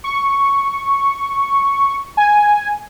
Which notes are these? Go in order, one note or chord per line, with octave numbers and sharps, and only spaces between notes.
C#6
G#5